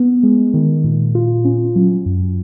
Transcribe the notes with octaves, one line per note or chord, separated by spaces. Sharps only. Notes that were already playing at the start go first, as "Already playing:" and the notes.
Already playing: B3
G#3
D#3
A#2
F4
C#4
F#3
F#2